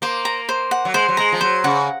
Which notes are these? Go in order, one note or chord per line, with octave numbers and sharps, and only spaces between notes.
A#3 C5
A#5
C5
F#5
F#3
G#3 C5
F#3
G#3 A#5
F3
F#3 C5
C#3 F#5